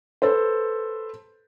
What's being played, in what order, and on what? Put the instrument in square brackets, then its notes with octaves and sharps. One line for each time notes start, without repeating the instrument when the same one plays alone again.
[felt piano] A4 B4 C5